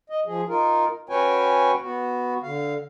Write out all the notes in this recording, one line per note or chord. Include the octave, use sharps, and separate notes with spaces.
D#5
F3 G#4
D#4 F4 A#4
C#4 F#4 B4 C#5 G5 G#5
B3 F#4
D3 F5